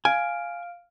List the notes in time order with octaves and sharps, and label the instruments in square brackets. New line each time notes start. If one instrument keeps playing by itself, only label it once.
[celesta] F5 F6 D7 [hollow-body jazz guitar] G#5